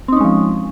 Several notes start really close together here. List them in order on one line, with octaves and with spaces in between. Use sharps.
C4 D#4 C#4 G#3 F3